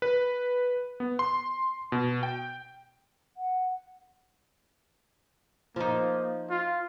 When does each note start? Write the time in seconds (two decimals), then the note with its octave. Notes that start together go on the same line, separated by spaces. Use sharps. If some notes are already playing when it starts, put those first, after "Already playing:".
0.02 B4
1.00 B3
1.19 C6
1.92 B2
2.23 G5
3.37 F#5
5.76 F3 A#3 D#4
6.50 F4